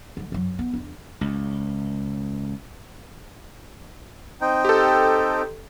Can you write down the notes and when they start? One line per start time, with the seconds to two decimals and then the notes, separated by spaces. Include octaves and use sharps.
0.17 D3 G3
0.32 F#2 F#3
0.59 B3
0.74 E2 D4
1.21 C#2
4.41 C4 D#4 G5
4.65 G4 A4